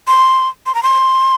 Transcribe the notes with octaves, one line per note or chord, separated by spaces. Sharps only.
C6
C6
A#5
C6